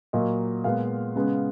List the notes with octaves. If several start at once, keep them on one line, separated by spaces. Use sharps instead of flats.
A#2 F#3 A#3 D#5
A#2 G#3 B3 F5
C#3 G#3 B3